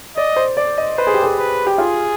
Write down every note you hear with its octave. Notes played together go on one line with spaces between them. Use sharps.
D5 D#5
C5
D5
D#5
B4 C5
G#4
G4
G#4
B4
G4
F4 G#4